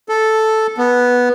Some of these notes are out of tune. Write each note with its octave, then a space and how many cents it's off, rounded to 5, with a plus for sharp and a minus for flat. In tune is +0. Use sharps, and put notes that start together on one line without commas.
A4 -5
B3 -5